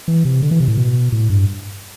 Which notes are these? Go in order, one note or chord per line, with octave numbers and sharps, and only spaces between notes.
E3
C3
D3
E3
C3
A2
B2
A2
G2